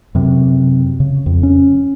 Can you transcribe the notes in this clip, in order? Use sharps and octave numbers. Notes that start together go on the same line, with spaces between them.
F#2 C3
C#3
F2
C#4